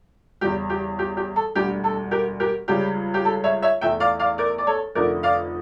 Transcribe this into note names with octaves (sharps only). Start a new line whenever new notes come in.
E2 C#3 G3 G4
G4
G4
G4
A4
E1 D2 D3 G3 G4
A4
G4 A#4
G4 A#4
C#2 C#3 G3 G4
G4
A4
C#5 E5
C#5 E5
E2 E3 A3 E5 G5
D5 F5
D5 F5
A#4 D5
D5
A4 C#5
F1 F2 D3 A3 A#4 D5
D5 F5